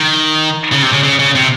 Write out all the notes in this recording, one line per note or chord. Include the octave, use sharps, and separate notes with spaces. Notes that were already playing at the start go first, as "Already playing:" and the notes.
Already playing: D#3
C#3
C3
C#3
C#3
C#3
C3